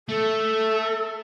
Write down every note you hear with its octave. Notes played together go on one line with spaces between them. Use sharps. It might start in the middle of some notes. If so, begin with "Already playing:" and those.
A3 A4